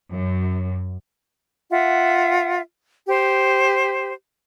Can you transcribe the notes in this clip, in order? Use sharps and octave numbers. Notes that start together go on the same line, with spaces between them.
F#2
F4 E5 F#5
G4 C5